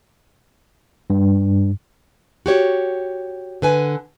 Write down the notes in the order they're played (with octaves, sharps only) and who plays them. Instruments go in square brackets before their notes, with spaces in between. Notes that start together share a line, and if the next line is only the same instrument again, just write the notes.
[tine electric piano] G2
[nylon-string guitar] F#4 G4 C#5
D3 B4 G#5